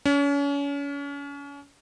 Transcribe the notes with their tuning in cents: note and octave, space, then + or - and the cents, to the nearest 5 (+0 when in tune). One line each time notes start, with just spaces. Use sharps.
C#4 +35